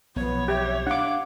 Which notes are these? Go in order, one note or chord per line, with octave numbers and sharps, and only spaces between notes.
B1 F3 B3 C#5
G4 E5
D4 F5 F#5 D6